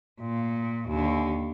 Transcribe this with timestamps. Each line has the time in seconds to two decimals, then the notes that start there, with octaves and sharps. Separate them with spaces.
0.20 A#2
0.88 D#2 D3